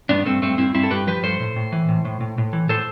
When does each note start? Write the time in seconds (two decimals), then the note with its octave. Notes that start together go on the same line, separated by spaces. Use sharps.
0.09 G2 B3 D4
0.25 G2 A3 C4
0.42 G2 A3 C4
0.58 G2 C4 E4
0.74 G2 C4 E4
0.83 A4
0.90 G2 G4 B4
1.07 F3 G4 B4
1.23 G2 A4 C5
1.40 A2
1.56 A2
1.72 E3
1.89 A2
2.05 A2
2.20 A2
2.38 A2
2.53 E3
2.69 A2 A4 C5